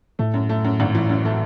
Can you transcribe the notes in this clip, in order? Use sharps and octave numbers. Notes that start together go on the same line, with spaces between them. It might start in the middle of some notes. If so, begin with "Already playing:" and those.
A2 A3
F#2
A3
F#2
G#1
E3
F#2
A3